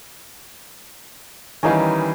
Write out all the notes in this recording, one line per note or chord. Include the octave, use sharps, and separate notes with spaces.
D#3 E3 G3 C#4 D#4 F5